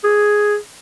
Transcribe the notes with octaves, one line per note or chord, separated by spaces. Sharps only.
G#4